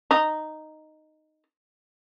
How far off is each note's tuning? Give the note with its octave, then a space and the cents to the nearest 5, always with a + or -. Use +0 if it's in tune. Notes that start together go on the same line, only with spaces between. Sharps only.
D#4 -5